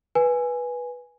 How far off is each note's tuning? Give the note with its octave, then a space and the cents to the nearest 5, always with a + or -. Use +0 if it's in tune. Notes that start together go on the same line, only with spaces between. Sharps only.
B4 -10 G#5 +0